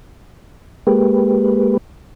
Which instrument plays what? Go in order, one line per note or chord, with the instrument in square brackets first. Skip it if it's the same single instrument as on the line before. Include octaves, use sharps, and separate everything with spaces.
[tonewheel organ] G#3 A#3 G4 B4